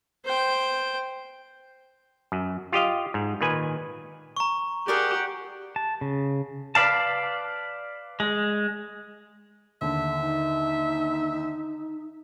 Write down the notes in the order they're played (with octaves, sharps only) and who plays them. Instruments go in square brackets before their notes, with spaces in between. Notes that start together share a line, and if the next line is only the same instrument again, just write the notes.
[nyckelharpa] C5 G5
[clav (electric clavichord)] F#2
F4 G4 D#5 F5
G#2
A#2 D#3 B4 G#5
[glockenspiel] A#5 C#6
[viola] G4 F#5 [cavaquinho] G#4 A#4 D5
[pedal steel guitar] A5
C#3
B4 D5 F5 A5
G#3
[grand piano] D#2 D3 [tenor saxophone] E5
[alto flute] D#4